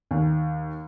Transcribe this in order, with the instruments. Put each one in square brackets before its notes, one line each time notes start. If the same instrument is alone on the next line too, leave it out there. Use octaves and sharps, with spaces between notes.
[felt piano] D#2